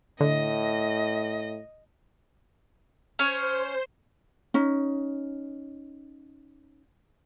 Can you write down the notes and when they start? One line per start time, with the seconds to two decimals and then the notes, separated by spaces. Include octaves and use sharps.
0.20 A2 D3 D#5
3.19 C#4 C5 C#5
4.54 C#4 D#4